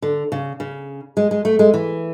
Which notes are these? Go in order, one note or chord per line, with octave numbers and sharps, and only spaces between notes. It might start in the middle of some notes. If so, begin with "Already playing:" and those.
D3
C#3
C#3
G#3
G#3
A3
G#3
E3